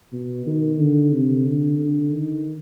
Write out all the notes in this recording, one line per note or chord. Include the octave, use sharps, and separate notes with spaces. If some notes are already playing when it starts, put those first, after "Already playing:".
B2
D#3
D3
C3
D3
D3
D#3